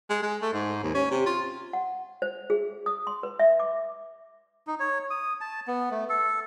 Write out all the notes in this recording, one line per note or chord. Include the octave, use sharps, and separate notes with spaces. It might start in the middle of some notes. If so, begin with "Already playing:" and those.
G#3
G#3
A3
G#2
D#2
C#4
C3
F4
F#5
C5
G#4
D#6
C6
B4
E5
D6
D#4
C#5
D#6
A5
B3
A3
A4